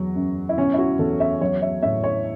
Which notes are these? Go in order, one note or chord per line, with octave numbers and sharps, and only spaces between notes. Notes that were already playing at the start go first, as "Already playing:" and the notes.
Already playing: E2 F#3
F#2
E4
B2 C#4
E4
F#4
E2 A4
E5
F#3 C#5
E5
A2 E5
C#5